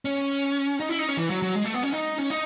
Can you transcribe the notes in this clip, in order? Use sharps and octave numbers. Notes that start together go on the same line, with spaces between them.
C#4
D#4
E4
D#4
C#4
E3
F#3
F#3
G#3
A3
B3
C#4
D#4
C#4
D#4